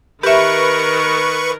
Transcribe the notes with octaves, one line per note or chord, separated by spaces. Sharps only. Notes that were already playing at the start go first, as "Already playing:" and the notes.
D#3 G4 A#4 B4 E5 C#6